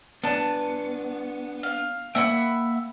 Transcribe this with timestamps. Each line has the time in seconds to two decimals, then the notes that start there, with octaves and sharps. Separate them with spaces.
0.24 B3 D4 A5 F#6
1.63 F5
2.15 A#3 E5 F#5 G5 B5